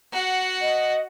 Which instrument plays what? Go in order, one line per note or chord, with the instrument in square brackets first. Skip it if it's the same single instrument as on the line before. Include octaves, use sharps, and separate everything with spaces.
[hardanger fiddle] F#4 F#5
[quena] D#5